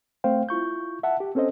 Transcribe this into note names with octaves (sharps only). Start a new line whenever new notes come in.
A3 C4 C5 F5 G5
E4 F4 C#6 G6
E5 F#5 A5
G4
C4 C#4 A4 C5 D#5